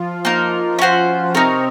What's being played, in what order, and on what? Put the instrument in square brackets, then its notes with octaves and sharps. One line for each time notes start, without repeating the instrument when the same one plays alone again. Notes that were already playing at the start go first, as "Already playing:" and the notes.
Already playing: [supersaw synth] F3 F4
[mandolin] A#3 D#4 A#4
C#4 F#4 C5
[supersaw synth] C3 C4 [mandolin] D#4 A#4 C#5